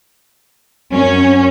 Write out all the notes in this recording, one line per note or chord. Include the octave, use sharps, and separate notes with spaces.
F#2 C#4